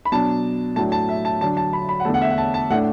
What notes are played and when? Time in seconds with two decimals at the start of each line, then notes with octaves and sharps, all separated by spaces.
0.05 B5
0.12 B2 F#3 D4 A5
0.76 A2 F#3 D4 A5
0.92 A5
1.09 E5
1.25 A5
1.41 D3 F#3 D4 A5
1.57 A5
1.73 B5
1.89 B5
2.00 F#5
2.05 E2 D3 A3 A5
2.14 F#5
2.22 E5
2.30 F#5
2.38 A5
2.54 A5
2.70 A2 A3 D4 F#5